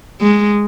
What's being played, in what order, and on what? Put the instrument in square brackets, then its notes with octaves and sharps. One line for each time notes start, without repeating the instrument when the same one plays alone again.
[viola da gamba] G#3